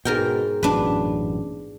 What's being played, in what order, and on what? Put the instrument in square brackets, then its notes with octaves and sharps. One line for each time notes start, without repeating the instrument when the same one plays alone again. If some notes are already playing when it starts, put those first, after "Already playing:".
[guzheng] G#2 A#4 G5 [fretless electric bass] B2
[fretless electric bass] A1 F#2 B2 [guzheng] D4 B4